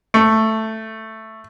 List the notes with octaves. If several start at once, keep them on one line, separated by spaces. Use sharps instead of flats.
A3